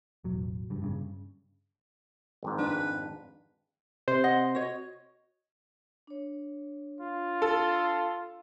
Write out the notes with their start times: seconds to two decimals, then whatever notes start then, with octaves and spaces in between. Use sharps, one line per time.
0.24 E1 A1 F#3
0.70 F#1 G2
0.82 G2 A#2 C#3
2.43 G#1 F2 G#2
2.59 D4 B4
4.08 C3 C5
4.24 C#5 D#5 F#5
4.55 F#4 C#5 D#5
6.07 D4 C#5
7.01 F4
7.42 A4